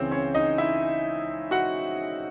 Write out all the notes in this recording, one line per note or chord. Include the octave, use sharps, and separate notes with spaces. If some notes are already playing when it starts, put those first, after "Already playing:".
Already playing: C#2 C#3 E3 C4 C#4 C5 C#5
C#4 C#5
D#4 D#5
E4 E5
F#4 F#5